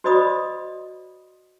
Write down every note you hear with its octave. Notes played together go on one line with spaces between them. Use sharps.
F#4 C5 D5 D#5 B5 D#6